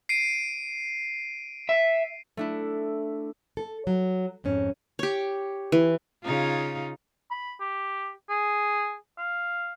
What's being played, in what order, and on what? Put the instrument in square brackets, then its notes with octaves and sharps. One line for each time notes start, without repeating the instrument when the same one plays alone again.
[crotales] C7 D7 D#7
[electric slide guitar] E5
[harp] A3 D4 E4
[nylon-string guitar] A4
F#3
F2 G#2 C#4
[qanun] G4 C#5
E3
[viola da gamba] C#3 D#4 F4
[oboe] B5
G4
G#4
F5